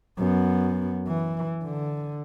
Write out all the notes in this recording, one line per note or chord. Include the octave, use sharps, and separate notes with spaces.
F#2 B3
E3
D3